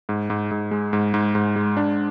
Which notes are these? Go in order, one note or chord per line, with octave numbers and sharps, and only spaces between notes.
G#2
G#2
G#2
G#3
G#2
G#2
G#2
G#3
D4